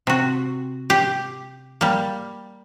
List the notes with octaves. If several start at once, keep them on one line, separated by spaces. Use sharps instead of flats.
C3 F#4
G4
G3 A#3